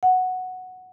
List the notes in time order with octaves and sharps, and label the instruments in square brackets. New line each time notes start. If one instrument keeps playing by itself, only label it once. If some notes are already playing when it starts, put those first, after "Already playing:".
[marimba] F#5